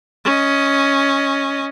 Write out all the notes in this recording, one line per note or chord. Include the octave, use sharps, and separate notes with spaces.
C#4 D#5